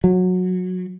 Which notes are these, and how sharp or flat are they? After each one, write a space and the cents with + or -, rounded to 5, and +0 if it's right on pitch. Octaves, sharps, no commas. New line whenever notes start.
F#3 -20